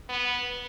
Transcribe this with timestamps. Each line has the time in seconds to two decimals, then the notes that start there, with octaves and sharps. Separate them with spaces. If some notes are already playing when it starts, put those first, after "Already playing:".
0.09 B3